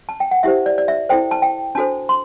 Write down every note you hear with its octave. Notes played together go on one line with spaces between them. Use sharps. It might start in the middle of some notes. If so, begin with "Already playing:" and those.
A5
G5
F#5
E4 G4 C5 E5
D5
D5
E5
E4 A4 C5 G5
A5
G5
D4 F#4 A4 C5 A5
C6